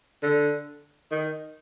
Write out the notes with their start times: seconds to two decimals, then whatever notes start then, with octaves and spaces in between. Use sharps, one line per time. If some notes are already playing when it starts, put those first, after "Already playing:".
0.22 D3
1.11 D#3